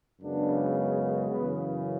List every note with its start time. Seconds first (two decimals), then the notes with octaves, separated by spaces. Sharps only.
0.21 F#2 C#3 G#3 B3 D4
1.31 F#2 C#3 E3 B3